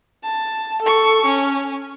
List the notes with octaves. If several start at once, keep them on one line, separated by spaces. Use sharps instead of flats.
A5
A4 C#6
C#4